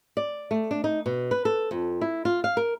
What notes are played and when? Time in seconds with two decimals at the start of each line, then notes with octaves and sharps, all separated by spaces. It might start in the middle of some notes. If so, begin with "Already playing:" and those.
0.17 D5
0.51 A3
0.71 D4
0.84 D#4
1.06 B2
1.31 B4
1.45 A4
1.71 F2
2.01 E4
2.25 F4
2.44 F5
2.57 A#4